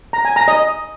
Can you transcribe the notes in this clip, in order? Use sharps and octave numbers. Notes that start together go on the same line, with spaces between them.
A#5
G#5
A#5
D#5